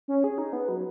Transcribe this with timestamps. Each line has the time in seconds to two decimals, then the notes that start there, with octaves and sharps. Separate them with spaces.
0.08 C#4
0.24 G#4
0.38 D#4
0.53 B3
0.68 F#3